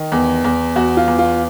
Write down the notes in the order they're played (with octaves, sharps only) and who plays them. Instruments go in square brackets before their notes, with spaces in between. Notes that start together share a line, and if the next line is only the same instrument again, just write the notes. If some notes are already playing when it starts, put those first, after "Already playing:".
Already playing: [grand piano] D#3
E2
E2
E2 F#4
F4
E2
F4